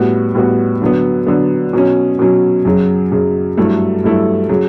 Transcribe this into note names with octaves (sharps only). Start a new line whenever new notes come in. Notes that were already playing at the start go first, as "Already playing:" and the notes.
Already playing: A2 G3 B3 F#4
A2 G3 B3 F#4
D3 F#3 B3
D3 F#3 B3
B2 F#3 C#4
B2 F#3 C#4
F#2 C#3 F#3
F#2 C#3 F#3
G2 F#3 A3 E4 A4
G2 F#3 A3 E4 A4
C#3 F#3